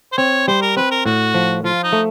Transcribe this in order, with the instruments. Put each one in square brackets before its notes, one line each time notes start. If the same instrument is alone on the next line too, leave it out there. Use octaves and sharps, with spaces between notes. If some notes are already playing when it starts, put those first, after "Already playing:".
[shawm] C5
[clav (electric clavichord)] C4 [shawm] C#5
[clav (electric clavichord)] G3 [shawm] C5
[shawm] A#4
[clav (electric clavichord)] C4 [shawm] B4
[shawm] A#4
[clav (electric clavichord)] A2 [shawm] F#4
[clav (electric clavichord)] F3
[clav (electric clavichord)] F3 [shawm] F4
[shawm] D#4
[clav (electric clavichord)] A3